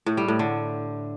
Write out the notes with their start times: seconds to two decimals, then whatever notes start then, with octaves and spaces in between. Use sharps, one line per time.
0.06 A2
0.17 G3
0.28 A2
0.39 D3